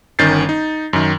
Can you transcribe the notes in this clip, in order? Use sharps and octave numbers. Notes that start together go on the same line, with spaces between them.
G1 D#3 C#4 G6 A6 C7
D#4
F#2 D#3